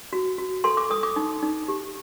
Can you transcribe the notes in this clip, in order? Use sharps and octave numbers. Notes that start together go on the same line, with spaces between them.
F#4
F#4
A4 C6
D6
A4 D#6
D6
D#4
D#4
G4